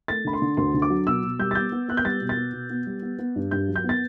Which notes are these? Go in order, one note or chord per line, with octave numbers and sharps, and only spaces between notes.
A3 A6
D3 B5
C6
D3
D2 C6
D3
D6
F#3
B2 E6
B2
G3 G6
A6
B3 G6
B3
B3 F#6
G6
G3 A6
B2
A6
B3
B2
B3
G3
B3
B3
G2
G2 G6
F#3
G6
B3
A6